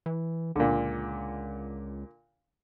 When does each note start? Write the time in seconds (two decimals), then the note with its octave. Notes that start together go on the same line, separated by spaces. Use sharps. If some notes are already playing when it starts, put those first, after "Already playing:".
0.06 E3
0.56 C#2 A#2 D3